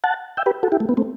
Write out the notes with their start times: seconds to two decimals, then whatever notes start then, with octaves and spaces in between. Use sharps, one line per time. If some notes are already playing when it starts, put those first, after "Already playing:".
0.04 F#5 A5
0.37 E5 G5
0.46 G4 B4
0.63 F#4 A4
0.72 E4 G4
0.80 A3
0.89 B3
0.97 A3 C4